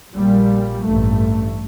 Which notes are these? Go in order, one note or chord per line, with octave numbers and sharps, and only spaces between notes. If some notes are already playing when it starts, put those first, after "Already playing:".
A#1 A#2 G3
A1 G2 A3